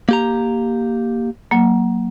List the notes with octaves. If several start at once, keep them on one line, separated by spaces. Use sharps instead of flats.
A#3 G4 A#5
F#3 A#3